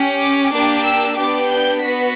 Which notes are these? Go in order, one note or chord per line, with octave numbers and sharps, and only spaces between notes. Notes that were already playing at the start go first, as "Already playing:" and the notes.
Already playing: C#4 G4
D6
A#3 D4 G4 D6
E6
B3 D4 G4 D6
G6
B3 F#4 B6